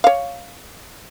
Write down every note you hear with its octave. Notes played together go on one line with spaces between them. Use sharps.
C#5 F5